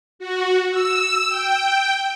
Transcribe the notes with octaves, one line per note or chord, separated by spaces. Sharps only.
F#4
E6
G5